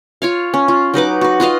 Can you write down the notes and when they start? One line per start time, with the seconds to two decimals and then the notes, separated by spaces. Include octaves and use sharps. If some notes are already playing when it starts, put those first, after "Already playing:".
0.22 F4 C#5 F5
0.54 C#4
0.68 F4
0.94 F#3 D#4 B4 D6
1.21 F#4 B4
1.40 F4 B4 D#5 F5